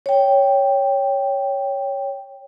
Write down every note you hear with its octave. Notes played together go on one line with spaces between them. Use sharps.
C#5 G5